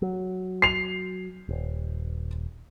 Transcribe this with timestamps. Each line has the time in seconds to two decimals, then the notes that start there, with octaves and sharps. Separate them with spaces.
0.02 F#3
0.62 C7 F7
1.49 D#1